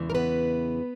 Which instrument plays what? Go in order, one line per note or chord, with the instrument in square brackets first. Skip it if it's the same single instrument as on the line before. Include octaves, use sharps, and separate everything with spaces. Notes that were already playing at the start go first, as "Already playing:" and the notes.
Already playing: [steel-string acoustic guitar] E2 C#3 E3 G#3
A#4
B3 B4